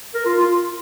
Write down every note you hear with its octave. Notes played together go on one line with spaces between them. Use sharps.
A#4
F4
F4